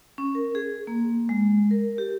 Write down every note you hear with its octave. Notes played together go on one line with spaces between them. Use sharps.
C#4
A#4
G#4
A#3
G#3
A#4
G4